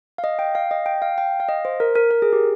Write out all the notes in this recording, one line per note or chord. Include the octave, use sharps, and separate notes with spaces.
F5
D#5
G5
F5
D#5
G5
F5
G5
F5
D#5
C5
A#4
A#4
A#4
G#4
G4